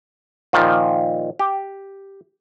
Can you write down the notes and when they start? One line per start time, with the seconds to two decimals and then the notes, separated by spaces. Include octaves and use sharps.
0.53 A#2 D#3 F3
1.39 G4